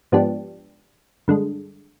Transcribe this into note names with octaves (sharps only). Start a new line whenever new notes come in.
G#2 F3 B3 D4 G4
G2 D3 G#3